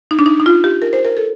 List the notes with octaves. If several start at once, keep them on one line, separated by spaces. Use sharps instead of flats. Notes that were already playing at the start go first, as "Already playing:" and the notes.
D#4
D4
D#4
D#4
F4
G4
A#4
C5
A#4
A4